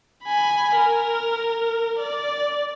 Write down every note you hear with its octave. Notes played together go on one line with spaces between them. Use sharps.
G#5 B5
A#4
D5